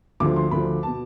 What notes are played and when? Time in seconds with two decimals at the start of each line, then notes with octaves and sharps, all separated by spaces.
0.20 D2 D3 F3 D6
0.36 C6
0.51 D2 D3 F3 B5
0.83 B2 A5